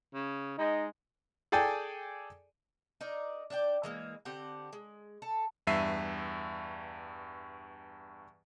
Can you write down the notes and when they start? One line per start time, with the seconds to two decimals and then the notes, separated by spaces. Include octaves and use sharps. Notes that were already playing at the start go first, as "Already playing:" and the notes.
0.14 C#3
0.58 G#3 D#4
1.52 G#4 A4 D5 G5 G#5
3.01 D#4 A#4 D5
3.50 D4 D5 F#5 G5
3.83 E3 G#3 A#3
4.25 D3 C4 G4 F#5
4.73 G#3
5.22 A4
5.67 E2 G2 E5 C7 D#7